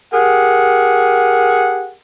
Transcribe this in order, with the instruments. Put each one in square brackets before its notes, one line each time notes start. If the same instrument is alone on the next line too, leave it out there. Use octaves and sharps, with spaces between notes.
[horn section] G4 G#4 A#4 F#5